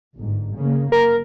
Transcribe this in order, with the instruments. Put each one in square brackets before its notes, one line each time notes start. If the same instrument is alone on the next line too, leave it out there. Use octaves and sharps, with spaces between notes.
[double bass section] G1 G#2
C#3 A#3
[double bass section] F#1 [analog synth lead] A#4